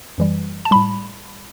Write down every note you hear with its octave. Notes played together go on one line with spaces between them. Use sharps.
F#2 E3 G3
A5
A2 G3 B5